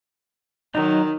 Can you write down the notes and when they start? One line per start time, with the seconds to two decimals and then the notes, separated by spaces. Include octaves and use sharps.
0.75 D#3 F#3 D#4